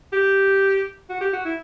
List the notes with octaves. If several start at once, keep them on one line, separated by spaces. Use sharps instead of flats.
G4
F#4
G4
F#4
E4